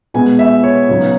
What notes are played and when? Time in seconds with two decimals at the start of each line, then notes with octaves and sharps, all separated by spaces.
0.14 B2 G#3 B3 G#5
0.39 E5
0.63 C#5
0.89 C#3 F#3 B3 D#4 C#5